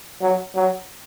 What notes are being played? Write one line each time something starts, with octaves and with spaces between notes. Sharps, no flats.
F#3
F#3